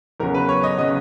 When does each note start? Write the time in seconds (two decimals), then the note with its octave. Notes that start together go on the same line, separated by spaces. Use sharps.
0.20 E2 C#3 F#3 A#4
0.34 B4
0.49 C#5
0.63 D#5
0.78 C#3 F#3 D#5